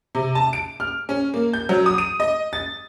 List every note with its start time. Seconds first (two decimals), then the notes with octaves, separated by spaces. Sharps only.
0.15 C3
0.35 A5
0.53 D7
0.80 F6
1.09 C#4
1.34 A#3
1.53 G6
1.69 F#3
1.86 D#6
1.98 D#7
2.20 D#5
2.53 A6